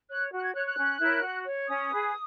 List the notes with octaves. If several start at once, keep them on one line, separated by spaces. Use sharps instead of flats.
C#5 F#6
F#4
F#6
G#6
C#5 F#6
F#6
C#4
E4 A#4 C#5
F#4
C#5
C#4 D#6
G#4 B4